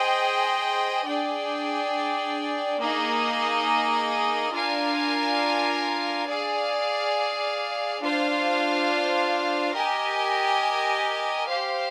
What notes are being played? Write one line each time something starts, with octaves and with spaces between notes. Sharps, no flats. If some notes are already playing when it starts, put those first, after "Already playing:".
Already playing: G#4 C5 D#5 G5
D4 G#4 D5 G5
A#3 D#4 G#4 D#5
D4 F4 A#4 F5 G#5
G#4 D5 F5
D4 F4 C5 F5
G4 A#4 D#5 G#5
G4 C5 F5